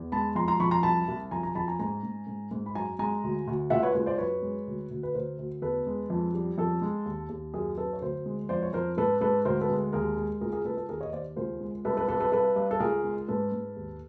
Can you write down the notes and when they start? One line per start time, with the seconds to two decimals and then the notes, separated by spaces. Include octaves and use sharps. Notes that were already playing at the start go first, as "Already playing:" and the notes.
Already playing: E2
0.12 G#3 A5 B5
0.35 F2 A#5 C6
0.48 A#5 C6
0.60 F2 B5 C#6
0.71 A#5 C6
0.83 C2 A5 B5
1.08 C2
1.31 F2 G#5 A#5
1.43 G#5 A#5
1.55 F2 A5 B5
1.68 G#5 A#5
1.79 G#2 G#5 A#5
2.03 G#2
2.27 G#2
2.51 G#2
2.66 B5
2.75 F#2 G#5 A#5
2.99 G#3 G#5 A#5
3.24 D2
3.47 D2
3.70 C#2 E5 F#5
3.83 B4 C#5
3.95 C#2
4.06 C5 D5
4.18 F#2 B4 C#5
4.42 G#3
4.67 D2
4.91 D2
5.03 B4
5.14 D2 A#4 C5
5.38 D2
5.62 E2 A4 B4
5.87 G#3
6.10 F2
6.34 G3
6.58 F2 A4
6.81 G#3
7.06 D#2
7.29 D#2
7.54 F#2 G#4 A#4
7.77 F#2 A4 B4
7.93 C#5
8.01 D2 A#4 C5
8.26 G#3
8.49 F2 C5 D5
8.63 C#5
8.73 F2 A#4 C5
8.97 G#2 A4 B4
9.21 G#2 A4 B4
9.45 D2 A#4 C5
9.61 A4 B4
9.70 G#3
9.93 D#2 G#4 A#4
10.17 G#3
10.41 C#2 G#4 A#4
10.53 G#4 A#4
10.65 C#2 A4 B4
10.77 A4
10.89 D#2 G#4 A#4
11.01 C#5 D#5
11.13 D#2 C5 D5
11.36 C#2 A#4 C5
11.60 G#3
11.85 C2 A4 B4
11.97 A4 B4
12.08 C2 A4 B4
12.20 A4 B4
12.32 G2 A4 B4
12.56 G2
12.71 A4
12.80 C#2 G#4 A#4
13.04 G#3
13.28 G#2 A4 B4
13.52 G#2
13.76 D#2